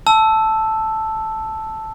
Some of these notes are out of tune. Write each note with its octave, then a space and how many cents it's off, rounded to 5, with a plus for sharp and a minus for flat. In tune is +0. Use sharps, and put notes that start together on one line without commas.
A5 +0 E6 +0